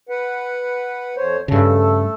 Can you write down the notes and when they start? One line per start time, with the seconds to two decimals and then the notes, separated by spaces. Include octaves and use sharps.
0.09 B4 F#5
1.16 F2 C5 C#5
1.48 G2 C#3 A3 A4